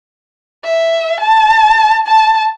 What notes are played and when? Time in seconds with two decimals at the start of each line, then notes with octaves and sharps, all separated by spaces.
0.64 E5
1.20 A5
2.07 A5